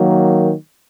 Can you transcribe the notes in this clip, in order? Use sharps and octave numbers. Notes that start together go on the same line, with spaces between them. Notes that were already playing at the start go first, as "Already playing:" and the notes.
Already playing: D#3 F#3 A#3